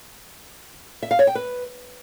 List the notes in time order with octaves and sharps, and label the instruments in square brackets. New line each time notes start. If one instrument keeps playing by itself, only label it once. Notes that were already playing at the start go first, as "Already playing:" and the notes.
[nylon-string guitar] E5
F5
C#5
G5
B4